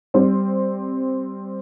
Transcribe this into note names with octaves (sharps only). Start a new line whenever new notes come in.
G3 C4